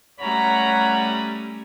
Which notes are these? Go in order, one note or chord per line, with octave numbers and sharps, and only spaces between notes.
G3 A3 C#4 C#5 F#5 A#5 B5